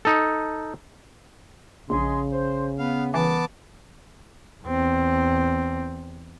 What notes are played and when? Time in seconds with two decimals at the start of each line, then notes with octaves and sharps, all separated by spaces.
0.05 D#4 A4
1.90 A#1 C#3 D#5 G#5 C6
2.32 C5
2.78 B3 F5
3.14 C2 E3 B3 A5 D6
4.64 E2 C4